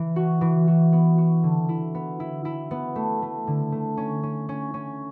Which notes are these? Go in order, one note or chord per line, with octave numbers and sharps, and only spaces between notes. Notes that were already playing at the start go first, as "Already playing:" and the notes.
Already playing: E3
F#4
E3
F#4
B3
F#4
D3
E4
B3
E4
E4
B3
A3
A3
D3
A3
C#4
C#4
C#4
C#4